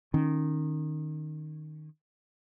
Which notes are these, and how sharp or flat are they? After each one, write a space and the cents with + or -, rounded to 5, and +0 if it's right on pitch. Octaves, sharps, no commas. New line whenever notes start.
D#3 -15 C#4 -20